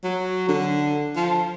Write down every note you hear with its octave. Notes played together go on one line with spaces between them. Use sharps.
F#3
D3
F3